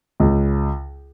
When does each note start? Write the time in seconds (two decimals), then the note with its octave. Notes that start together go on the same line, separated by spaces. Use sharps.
0.20 C#2